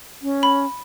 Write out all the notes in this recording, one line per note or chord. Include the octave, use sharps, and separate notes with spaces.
C#4
B5